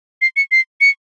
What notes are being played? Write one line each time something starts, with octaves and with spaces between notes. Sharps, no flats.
C7
C#7
C7
C#7